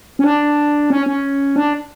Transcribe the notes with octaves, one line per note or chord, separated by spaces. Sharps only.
C#4
D4
C#4
C#4
D4